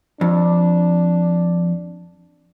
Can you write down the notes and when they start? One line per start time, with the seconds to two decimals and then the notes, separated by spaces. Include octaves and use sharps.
0.21 F2 D4